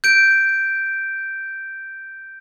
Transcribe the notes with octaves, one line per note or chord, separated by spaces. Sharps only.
G6 D7